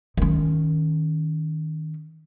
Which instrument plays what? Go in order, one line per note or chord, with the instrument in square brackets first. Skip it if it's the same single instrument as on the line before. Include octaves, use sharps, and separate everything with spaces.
[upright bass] D#3 C#4